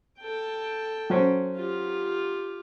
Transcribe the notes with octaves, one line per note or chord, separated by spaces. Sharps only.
A4 G5
F#3 C#4 C5
F4 G4